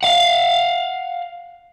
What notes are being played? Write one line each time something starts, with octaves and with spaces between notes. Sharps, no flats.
F5 F#5